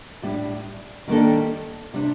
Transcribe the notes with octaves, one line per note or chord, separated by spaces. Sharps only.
A2 G3 D4
D#3 G3 A#3 D4 A4
C3 G3 D4